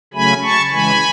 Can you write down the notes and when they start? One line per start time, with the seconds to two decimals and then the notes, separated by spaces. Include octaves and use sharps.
0.14 C#3 F#3 A3 C#4 G#5 B5
0.42 A5 C#6
0.71 C#3 E3 G#3 G#5 B5